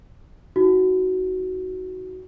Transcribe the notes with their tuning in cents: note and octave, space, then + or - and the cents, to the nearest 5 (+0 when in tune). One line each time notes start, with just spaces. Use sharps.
D#4 +40 F#4 +5